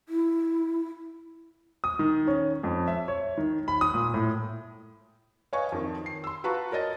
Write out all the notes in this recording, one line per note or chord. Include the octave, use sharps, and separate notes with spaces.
E4
D#6
D#3
C#4
F2
E5
C#5
D#3
B5
D#6
A#2
A2
B4 C#5 D#5 F5 G#5 C#6
F2 D#3
C7
C6 E6
F4 F#4 B4 A5 A#5 C#6
A#4 C#5 D#5 A6